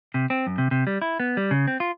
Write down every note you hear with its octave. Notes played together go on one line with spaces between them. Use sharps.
C3
C4
F#2
C3
C3
G3
E4
B3
G3
C#3
C4
F4